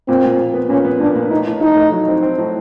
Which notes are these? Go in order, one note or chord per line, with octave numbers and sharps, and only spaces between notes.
A#2 C4
A#2
A#2
B3
A#2 C#4
B3
A#2 D4
A#2
A2 D#4
A2
A2 D#4
A3
F#3
C4
C4
A2